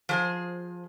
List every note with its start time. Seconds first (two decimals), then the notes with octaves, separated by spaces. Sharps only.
0.09 F3 G#4 C5